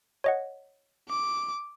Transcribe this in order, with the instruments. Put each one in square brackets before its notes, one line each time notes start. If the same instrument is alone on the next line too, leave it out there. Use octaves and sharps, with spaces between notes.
[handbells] C#5 D#5 F#5
[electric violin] D6